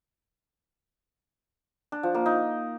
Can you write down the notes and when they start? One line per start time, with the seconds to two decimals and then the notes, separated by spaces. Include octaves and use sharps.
1.92 D4
2.03 F3
2.15 A#3
2.26 D#4